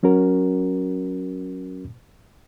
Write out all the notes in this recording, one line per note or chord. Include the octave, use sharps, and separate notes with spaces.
F#3 C#4 F#4 A#4